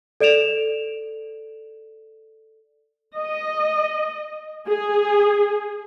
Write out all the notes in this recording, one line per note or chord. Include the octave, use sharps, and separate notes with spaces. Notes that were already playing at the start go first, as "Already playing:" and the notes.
A4 D5 D7 E7 F7
D#5
G#4